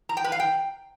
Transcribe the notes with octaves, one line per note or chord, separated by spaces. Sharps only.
A#5
G5
B4
F5
G5